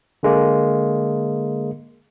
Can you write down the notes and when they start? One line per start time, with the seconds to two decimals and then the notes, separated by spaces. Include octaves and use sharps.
0.23 D3 G#3 A#3